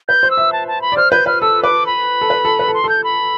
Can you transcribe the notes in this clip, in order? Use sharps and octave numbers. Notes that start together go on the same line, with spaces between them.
B4 G6
C5
E6
E5
A5
A5
B5
D5
C5 F6
B4 G6
B4 F6
A4 E6
B4 D6
B5
A4
B4
A4
B4
A4
C6
A4
G6
B5